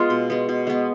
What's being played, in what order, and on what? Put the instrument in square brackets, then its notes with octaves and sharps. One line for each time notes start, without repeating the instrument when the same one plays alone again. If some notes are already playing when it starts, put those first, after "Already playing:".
Already playing: [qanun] G#3 B3 F4
B2
G#3 B3
B2
G#3 B3